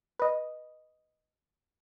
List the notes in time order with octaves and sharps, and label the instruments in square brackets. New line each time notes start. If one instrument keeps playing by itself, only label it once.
[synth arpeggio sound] B4 D#5